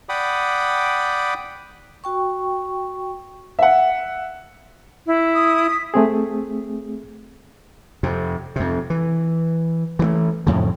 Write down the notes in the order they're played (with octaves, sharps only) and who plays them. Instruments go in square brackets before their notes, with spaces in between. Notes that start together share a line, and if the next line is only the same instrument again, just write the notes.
[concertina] D5 F#5 G5 B5 D6 D#6
[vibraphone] F#4 G5 C#6
[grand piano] E5 F#5
[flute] E4
[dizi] D#6
[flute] B6
[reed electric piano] A3 C4 G#4
[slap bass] F2 C3
F2 C3
E3
E3 F3 A3
F2 A2 C#3